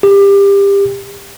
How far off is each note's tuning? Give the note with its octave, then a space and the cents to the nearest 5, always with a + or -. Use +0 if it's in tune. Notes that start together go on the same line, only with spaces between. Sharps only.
G4 +25